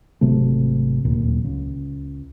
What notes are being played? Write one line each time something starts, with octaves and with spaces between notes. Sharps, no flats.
G#1 C3 F#3 A3
D1 D#2 A#2
C#2